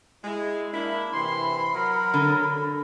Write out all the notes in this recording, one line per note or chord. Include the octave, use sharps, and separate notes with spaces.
G#3 E4
A#3 D4 E4 B5
C3 E3 C6
F#3 A#4
D3